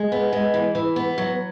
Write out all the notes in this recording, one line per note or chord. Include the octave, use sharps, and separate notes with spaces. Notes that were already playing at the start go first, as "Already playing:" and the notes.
Already playing: G#3
B3
G#3
E3
E3
B3
F#3